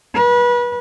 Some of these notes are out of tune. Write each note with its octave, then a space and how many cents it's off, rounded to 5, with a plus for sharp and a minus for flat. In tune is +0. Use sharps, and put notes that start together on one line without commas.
B4 -30